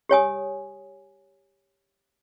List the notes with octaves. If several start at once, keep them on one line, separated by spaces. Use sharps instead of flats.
G4 C#5 G#5 D#6